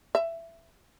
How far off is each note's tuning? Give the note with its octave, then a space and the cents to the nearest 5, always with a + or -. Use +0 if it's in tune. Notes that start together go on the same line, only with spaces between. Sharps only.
E5 +15